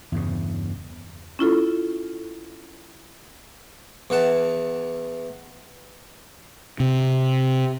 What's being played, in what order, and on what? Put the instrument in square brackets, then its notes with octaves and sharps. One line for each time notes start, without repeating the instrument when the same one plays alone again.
[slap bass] E2 G2 C#3
[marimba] C#4 E4 F4 A4
[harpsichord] E2 E3 F#5 A5
[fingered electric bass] C3